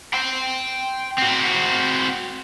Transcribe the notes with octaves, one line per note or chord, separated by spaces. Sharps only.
G5 C6
C4 F#4